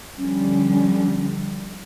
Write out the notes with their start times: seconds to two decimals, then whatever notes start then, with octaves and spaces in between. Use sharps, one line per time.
0.18 D3 F3 G3 C#4